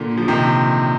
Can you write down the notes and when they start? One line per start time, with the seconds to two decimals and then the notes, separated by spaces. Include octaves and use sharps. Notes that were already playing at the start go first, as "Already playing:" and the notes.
Already playing: A#2 D3
0.17 F3
0.28 C3 D#3